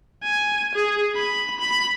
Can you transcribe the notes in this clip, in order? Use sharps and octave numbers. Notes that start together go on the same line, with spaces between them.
G#5
G#4
B5
B5